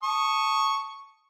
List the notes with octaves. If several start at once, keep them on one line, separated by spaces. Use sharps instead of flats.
A5 C#6 D#6